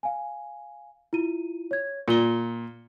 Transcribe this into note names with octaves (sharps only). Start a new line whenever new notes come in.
F5 G#5
E4 F4 D#7
C#5 G#6
A#2 C#7 G7